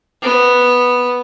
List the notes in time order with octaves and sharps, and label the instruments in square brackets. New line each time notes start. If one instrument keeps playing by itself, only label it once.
[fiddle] B3